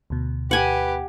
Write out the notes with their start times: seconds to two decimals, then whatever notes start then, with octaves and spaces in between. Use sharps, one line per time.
0.10 D2 B2
0.51 G4 B4 F#5 G#5